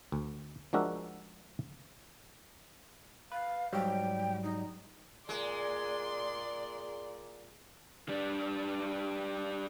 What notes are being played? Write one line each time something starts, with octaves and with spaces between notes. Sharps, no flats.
D2
F3 G#3 D4 F#4 A#4 E5
B4 F5
G#2 F#3 G3 G5
D#4
A#2 G#3 D5 C6
G3 D4